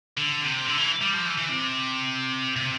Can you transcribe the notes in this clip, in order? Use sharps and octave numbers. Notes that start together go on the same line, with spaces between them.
D3
C3
D3
E3
G3
F3
E3
E3
C3
C3